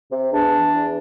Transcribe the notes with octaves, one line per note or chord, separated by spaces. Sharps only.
C3
E2 D4
E3
E2